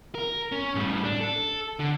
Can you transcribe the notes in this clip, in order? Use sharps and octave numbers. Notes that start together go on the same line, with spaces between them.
A#4
C#4
A2 G3
D4
A4
D3